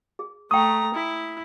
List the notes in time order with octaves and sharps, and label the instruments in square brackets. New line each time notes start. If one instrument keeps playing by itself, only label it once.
[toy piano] G#4
[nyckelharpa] A3 A#5 [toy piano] G5 C#6 [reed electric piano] D#6
[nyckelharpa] E4